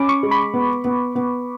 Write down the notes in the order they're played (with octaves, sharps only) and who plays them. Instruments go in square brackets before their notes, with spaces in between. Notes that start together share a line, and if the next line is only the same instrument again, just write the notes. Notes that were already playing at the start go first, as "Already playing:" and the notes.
Already playing: [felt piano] C#4 [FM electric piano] B5 D6
[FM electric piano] C#6
[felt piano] G#3
[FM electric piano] B5
[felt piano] B3
B3
B3